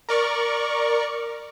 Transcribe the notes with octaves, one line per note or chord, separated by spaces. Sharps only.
A#4 D5 C#6